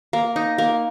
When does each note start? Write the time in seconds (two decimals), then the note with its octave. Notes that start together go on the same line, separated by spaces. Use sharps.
0.13 A#3
0.36 D#4
0.58 A#3